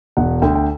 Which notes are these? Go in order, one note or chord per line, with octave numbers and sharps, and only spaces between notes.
E1 F#5
D2 D3 G5
G5